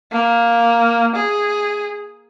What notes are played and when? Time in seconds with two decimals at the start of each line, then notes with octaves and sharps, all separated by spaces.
0.12 A#3
1.15 G#4